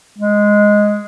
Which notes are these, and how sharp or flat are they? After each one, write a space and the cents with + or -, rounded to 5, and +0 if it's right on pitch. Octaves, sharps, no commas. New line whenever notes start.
G#3 +0